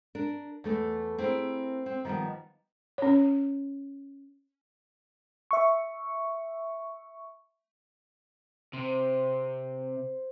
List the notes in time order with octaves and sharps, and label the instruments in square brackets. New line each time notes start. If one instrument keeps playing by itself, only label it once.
[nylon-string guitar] D4 A#4
E2 A3 A4
C4 E4 G#4 A#4
C4
D#3 F3 G3 B3 D#5
[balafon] C#4 C#5
[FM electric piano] E5 C#6
[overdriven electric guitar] C3 [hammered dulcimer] C5